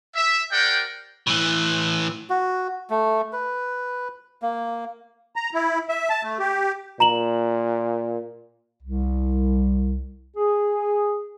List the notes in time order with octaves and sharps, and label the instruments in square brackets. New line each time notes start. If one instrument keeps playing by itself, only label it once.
[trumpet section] E5
G4 A#4 C5 D5 F#5 G5
[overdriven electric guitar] A2 E3
[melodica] F#4
A3
B4
A#3
[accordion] A#5
E4
E5
A5
A3
G4
[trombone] A#2 [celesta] A#5 E7 F#7
[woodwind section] C2
G#4